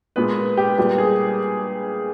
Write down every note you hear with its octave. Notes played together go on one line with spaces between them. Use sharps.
A#2 G#3 B3 B4
G4
A#2 G3 B3 G4
G#4